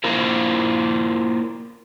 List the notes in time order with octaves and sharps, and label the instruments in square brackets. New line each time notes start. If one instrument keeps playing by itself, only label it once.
[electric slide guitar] A#3 E4 F4 A#4 C5